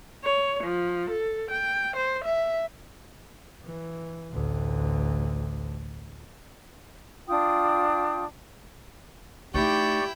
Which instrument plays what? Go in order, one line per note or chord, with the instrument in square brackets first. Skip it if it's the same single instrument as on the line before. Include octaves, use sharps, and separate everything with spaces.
[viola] C#5
F3
A4
G5
C5
E5
[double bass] E3
A1 D2
[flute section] D4 F4 G5 D#6
[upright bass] A3 D#4 [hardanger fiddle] E4 G5 [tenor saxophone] G4 [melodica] D5 C#6